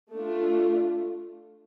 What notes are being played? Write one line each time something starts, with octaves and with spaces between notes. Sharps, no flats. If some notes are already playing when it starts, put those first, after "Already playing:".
A3 D4 F4